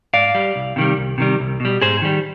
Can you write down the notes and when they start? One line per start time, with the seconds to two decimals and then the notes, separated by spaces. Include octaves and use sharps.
0.14 G#2 D5 F5
0.35 G3
0.56 C2
0.76 C3 D#3 G3
0.97 C2
1.18 C3 D#3 G3
1.40 C2
1.60 B2 G3
1.82 G#2 G#4 C5
2.02 D#3 G3